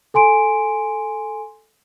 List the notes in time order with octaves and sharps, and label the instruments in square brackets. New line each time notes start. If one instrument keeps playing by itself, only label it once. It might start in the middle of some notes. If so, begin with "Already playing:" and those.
[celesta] A4 G#5 C6 D7